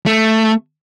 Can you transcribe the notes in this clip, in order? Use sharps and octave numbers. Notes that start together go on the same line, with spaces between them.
A3